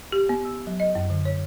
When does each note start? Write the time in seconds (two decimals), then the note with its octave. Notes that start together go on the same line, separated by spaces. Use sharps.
0.12 G4
0.29 B3
0.45 E6
0.67 F#3
0.80 D#5
0.95 F#2
1.10 D3
1.25 C#5